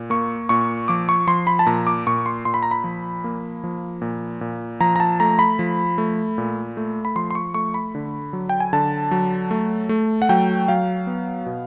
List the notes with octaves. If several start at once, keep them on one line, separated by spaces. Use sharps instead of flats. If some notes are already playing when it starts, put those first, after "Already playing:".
Already playing: A#2
A#3 C#6
A#2 C#6
F3 D6
C#6
F3 C6
B5
A5
A#2 A#5
D6
A#2 C#6
C6
A#2 C6
B5
A#5
B5
F3
A#3
F3
A#2
A#2
F3 A#5
A#5
A5
A3 A#5
B5
F3
A3
A#2
A3
B5
F3 C6
C6
C#6
A3 C#6
B5
D3
F#3
G5
G#5
D3 A5
F#3
A3
A3
F#5
F#3 G5
F#3 F5
B3
B2